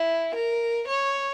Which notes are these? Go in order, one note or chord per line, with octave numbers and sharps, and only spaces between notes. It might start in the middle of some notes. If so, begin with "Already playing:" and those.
Already playing: E4
A#4
C#5